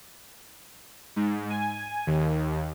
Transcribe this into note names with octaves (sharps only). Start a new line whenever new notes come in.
G#2
G#5
D#2